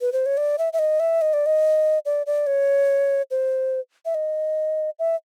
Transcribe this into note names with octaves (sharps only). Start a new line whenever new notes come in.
B4
C5
C#5
D5
E5
E5
D#5
E5
D#5
D5
D#5
D5
D5
C#5
C5
E5
D#5
E5